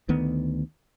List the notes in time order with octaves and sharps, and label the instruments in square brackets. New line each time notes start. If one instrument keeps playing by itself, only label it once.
[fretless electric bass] D2 D#3 B3